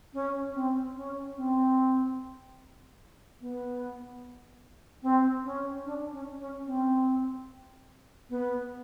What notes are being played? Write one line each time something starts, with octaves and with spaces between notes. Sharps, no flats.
C#4
C4
C#4
C4
B3
C4
C#4
D4
C#4
C#4
C4
B3